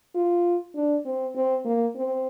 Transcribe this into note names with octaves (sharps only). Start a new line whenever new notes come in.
F4
D4
C4
C4
A#3
C4